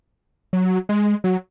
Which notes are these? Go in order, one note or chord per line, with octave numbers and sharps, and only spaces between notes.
F#3
G#3
F#3